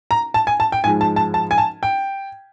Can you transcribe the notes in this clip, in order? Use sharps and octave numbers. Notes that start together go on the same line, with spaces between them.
A#5
A5
G#5
A5
G5
G#2 F3 G#3 G#5
A5
A5
A5
G#5
A5
G5